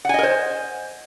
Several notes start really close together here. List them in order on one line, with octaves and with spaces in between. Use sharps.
F#5 G#5 D#5 A#4 C5